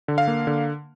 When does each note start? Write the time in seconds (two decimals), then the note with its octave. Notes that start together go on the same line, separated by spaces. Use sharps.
0.08 D3
0.18 F5
0.28 A#3
0.47 D3